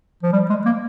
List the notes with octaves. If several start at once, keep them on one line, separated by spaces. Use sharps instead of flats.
F3
G3
G#3
A#3